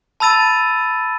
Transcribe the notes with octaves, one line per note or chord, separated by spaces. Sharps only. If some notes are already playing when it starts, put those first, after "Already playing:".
A5 B5 E6 A6 D#7